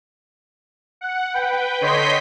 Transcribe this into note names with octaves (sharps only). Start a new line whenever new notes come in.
F#5
B4 G5
D3 C#5 D#5 C6 G6 B6